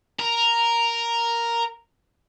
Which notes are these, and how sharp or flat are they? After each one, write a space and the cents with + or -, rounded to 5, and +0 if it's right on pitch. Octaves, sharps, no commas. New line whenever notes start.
A#4 +0 A#5 +0